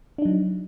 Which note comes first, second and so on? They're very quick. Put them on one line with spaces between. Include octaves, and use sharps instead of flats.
D4 D#4 F#3